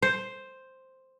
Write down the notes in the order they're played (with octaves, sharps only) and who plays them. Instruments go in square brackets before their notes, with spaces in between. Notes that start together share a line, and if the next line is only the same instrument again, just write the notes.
[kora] C5